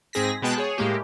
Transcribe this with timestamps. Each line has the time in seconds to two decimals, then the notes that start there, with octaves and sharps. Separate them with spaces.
0.13 G#2 C4 G#4 A#6 B6
0.42 B2 G#3 B3 G5 A5 F#6
0.58 G#4 C#5
0.78 A2 G#3 A#3 G4